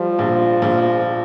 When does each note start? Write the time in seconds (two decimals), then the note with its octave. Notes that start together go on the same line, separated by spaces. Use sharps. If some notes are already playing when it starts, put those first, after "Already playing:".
Already playing: F3 G3
0.19 A#1
0.62 A#1